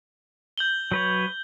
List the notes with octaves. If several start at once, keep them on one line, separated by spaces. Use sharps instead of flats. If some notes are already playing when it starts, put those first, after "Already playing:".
G6 F#7 G7
F#3 B4 C#5